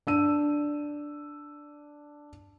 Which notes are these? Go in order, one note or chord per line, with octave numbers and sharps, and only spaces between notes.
D4 E6 D#7